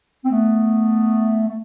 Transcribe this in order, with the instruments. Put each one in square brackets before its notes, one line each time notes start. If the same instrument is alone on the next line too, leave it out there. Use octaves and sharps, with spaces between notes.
[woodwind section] C4
A3 B3
A3